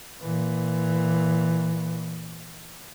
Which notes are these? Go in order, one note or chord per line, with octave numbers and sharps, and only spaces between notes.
A#2 E3